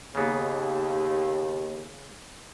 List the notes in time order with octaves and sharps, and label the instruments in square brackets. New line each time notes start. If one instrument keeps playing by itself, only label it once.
[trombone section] D#2 [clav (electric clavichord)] C#3 A#3 B3